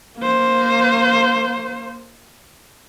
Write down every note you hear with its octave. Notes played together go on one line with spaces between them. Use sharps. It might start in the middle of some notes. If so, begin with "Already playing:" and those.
A#3 C5